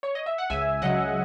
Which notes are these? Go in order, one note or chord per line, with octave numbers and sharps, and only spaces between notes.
C#5
D#5
E5
F#5
C#2 E5 G#5
C#3 F#3 D#5 F#5